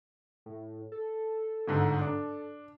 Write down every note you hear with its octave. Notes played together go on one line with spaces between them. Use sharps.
A2
A4
G1 G#2 D3
D4